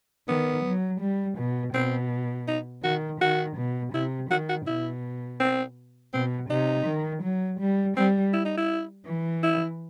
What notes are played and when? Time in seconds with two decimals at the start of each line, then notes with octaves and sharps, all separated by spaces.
0.28 D#3 B3
0.65 F#3
1.02 G3
1.38 B2
1.75 B2 C4
2.48 D#4
2.84 D#3 F#4
3.21 D#3 F#4
3.58 B2
3.94 C3 E4
4.31 D#3 F#4
4.49 F#4
4.67 B2 E4
5.40 C4
6.13 B2 C4
6.50 C3 D#4
6.87 D#3
7.24 F#3
7.60 G3
7.97 G3 C4
8.33 E4
8.45 D#4
8.58 E4
9.07 E3
9.43 E4